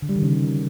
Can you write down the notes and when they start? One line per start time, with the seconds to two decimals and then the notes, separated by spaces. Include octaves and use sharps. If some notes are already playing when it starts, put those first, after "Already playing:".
0.02 D3
0.09 G3
0.16 D#3
0.22 C#3